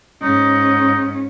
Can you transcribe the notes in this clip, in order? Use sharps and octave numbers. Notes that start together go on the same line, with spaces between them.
G#2 C#4 D#4